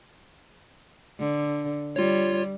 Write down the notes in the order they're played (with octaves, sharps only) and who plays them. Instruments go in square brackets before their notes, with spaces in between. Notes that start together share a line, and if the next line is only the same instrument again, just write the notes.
[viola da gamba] D3
[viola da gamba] G3 [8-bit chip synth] F4 C#5